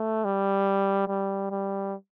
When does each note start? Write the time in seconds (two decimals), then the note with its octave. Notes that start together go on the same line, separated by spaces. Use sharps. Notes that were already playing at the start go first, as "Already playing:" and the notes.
Already playing: A3
0.25 G3
1.08 G3
1.51 G3